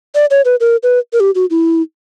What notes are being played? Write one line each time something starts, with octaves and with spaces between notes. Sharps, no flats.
D5
C#5
B4
A#4
B4
A#4
G4
F#4
E4